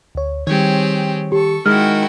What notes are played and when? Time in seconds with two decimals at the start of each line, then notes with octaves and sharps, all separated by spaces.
0.15 D2 C#5
0.47 D#3 G3 C4 G4 G#4 C#5
1.32 G4 A4 C#6
1.66 D#3 G#3 E4 F#4 G5 F6